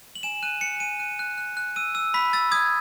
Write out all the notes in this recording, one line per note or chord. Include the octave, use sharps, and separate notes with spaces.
F#7
G#5 E7
F#6 D#7
G#5 C#7
G#5 D#7
F#6 D#7
F#6
F#6
F#6
E6 D#7
E6
B5 B6
E6 A6
D#6 G#6